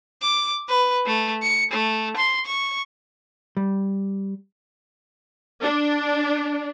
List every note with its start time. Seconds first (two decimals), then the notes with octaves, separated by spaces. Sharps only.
0.22 D6
0.68 B4
1.06 A3
1.42 C#7
1.72 A3
2.16 C6
2.46 C#6
3.57 G3
5.62 D4